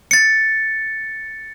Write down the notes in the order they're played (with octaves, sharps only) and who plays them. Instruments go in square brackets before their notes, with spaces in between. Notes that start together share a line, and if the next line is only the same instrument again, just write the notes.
[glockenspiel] A6 C#7